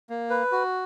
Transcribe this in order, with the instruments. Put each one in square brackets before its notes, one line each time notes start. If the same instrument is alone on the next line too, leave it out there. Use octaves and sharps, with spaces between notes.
[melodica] A#3
B4
F#4